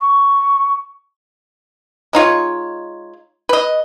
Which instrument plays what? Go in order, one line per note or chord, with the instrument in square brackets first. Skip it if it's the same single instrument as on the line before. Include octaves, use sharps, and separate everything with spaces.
[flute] C#6
[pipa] G#3 D#4 F4 C#5
B4 D#5